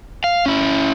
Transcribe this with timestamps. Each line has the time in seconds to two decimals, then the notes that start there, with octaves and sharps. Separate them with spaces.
0.24 F5
0.46 C#4 E4